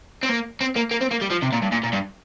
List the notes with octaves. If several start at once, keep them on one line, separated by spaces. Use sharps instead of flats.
C4
A#3
C4
A#3
A#3
C4
A#3
G3
F3
C3
A#2
G2
A#2
A#2
G2